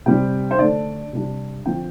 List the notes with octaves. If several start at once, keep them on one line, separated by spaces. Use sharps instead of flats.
C3 G3 C4 G5
C5
D3 A3 D4 D5
C3 G3 D4
D3 F3 C4 G5